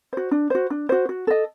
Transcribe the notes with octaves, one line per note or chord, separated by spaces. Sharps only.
F#4 C5
D4
F#4 C5
D4
F#4 C5
F#4
A4 D#5